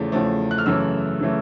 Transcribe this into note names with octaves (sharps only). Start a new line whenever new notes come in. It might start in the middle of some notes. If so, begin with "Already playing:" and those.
Already playing: E2 C#3 F3 A3
E2 C#3 F3 A3
F#6
F6
F#2 C#3 E3 A3 E6
C#3 E3 A3